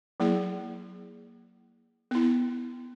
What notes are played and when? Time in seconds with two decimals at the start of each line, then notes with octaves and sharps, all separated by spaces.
0.20 F#3 A#3 E4 G#4
2.11 B3 E4